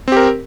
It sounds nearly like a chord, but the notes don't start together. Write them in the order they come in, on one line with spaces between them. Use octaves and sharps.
C4 G4 A#4